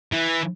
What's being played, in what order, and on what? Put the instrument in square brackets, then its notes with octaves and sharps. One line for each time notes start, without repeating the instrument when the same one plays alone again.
[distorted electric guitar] E3